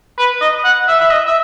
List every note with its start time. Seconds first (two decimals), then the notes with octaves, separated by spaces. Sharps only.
0.18 B4
0.41 D#5
0.65 F#5
0.88 E5
1.01 E5
1.10 D#5
1.27 E5